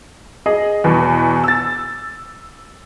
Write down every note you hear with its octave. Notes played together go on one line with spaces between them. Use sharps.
G#4 D#5
E2 B2
E6 A6